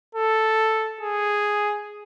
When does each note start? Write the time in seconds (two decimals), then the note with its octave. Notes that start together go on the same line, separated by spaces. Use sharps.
0.15 A4
1.01 G#4